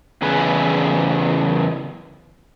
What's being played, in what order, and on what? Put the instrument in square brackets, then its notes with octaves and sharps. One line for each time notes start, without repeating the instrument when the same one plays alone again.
[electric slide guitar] E2 C#3 G#4 B4